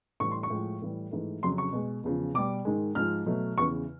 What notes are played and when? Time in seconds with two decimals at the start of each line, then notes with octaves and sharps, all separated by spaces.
0.20 A2 E3 G3 C#6
0.32 C6
0.43 C#6
0.50 A2 F3 G#3
0.82 A2 E3 G3
1.11 G#2 E3 A3
1.43 F2 C#3 F#3 C6
1.58 C#6
1.73 B2 G#3
2.04 E2 C#3 F3
2.34 B2 G3 D6
2.65 G#2 D#3 G#3
2.95 G#2 F3 G#3 F6
3.26 B2 F#3 A3
3.58 E2 C#3 E3 C#6